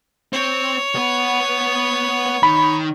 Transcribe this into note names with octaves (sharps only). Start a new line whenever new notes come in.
C4 C#5
B3 B4
D#3 B5